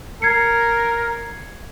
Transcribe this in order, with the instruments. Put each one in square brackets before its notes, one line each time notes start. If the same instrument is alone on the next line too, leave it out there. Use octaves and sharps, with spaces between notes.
[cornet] A#4 [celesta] G#6 C7 C#7